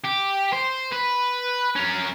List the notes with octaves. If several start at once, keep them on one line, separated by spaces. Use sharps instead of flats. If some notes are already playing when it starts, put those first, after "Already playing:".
G4
C5
B4
C#4 A#4